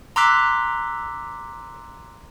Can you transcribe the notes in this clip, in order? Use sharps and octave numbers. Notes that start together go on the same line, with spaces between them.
A#5 C6 D6 E6 F#6 B6